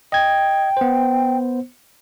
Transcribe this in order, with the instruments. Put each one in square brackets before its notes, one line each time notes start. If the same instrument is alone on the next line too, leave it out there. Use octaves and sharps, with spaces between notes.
[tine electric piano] D#5 G#6 [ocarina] G5
[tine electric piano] B3 C5